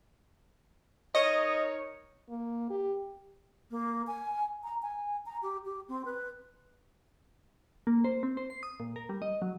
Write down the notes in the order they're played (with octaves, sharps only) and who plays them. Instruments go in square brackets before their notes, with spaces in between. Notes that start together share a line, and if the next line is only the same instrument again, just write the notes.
[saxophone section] D#4 A#4 C#5 [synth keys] D#5
[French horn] A#3
G4
[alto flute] A#3
G#5
A#5
G#5
A#5
G4
G4
C4
B4
[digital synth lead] A#3
C5
C4
C5
C7
D#6
A#2
A#4
G3
D#5
F#3